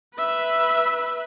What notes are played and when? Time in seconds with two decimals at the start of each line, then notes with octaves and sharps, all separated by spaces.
0.16 B4 E5